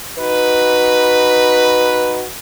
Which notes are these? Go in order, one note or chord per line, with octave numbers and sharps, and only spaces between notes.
D#4 F#4 B4